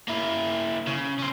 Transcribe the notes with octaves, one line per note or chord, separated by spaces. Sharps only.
A#3 E4
C#3
C#4 C5